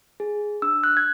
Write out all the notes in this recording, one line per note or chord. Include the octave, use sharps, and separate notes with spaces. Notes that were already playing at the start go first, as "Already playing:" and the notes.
G#4
D4 E6
F#6
G#6